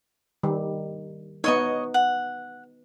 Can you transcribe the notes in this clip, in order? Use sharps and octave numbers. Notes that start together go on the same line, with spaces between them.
D#3 G3
B3 D#4 C#5 D#5 C#6
F#5